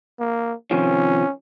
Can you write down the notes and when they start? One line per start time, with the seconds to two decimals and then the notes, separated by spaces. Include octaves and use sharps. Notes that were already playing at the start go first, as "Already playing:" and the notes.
0.20 A#3
0.71 C3 D#3 F3 C#4